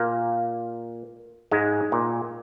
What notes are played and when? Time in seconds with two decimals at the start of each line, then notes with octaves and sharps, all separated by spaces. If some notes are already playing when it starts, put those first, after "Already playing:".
Already playing: A#2 A#3
1.51 G#2 G#3
1.92 A#2